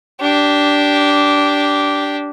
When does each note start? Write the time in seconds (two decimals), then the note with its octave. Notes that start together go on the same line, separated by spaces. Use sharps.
0.21 D4 G4